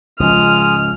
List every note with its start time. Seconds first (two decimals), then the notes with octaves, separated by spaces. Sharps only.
0.20 C#2 G#2 C#3 F3 G#3 D#6 F6